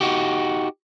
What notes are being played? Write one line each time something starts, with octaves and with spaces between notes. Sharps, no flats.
D#4 F#4 G4